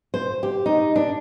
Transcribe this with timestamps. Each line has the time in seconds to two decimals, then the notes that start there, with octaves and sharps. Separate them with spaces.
0.14 C5
0.43 G4
0.66 D#4
0.96 D4